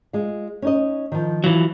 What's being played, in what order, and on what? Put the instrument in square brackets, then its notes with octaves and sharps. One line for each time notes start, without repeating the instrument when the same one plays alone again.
[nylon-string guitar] G#3 F4
C#4 D#4 D#5
D#3 F3
[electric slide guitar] E3 F#3 [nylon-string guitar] F4